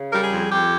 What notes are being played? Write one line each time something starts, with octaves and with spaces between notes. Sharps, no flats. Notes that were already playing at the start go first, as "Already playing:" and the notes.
Already playing: C#3
G3 A#4
G#4
F2
F2 G4